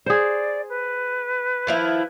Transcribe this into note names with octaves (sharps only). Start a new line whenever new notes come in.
G#4 C5 D5
B4
D#3 F3 E4